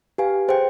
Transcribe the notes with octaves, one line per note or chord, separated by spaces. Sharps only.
G4 B4 F5 G#5
G#4 C5 G5